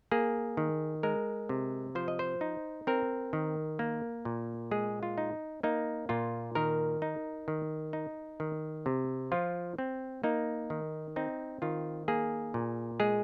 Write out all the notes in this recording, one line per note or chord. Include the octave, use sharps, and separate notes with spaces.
A#3 G#4
D#3
G#3 A#4
C3
F3 C5
D#5
C5
D#4
C4 A#4
D#3
A#3
A#2
G#3 G#4
F4
D#4
A#3 D#4
A#2 F4
D#3 A#4
D#4
D#3
D#4
D#3
C3
F3 F4
C4
A#3 D#4
D#3
C4 D#4
D#3 F4
A#3 G#4
A#2
G#3 G#4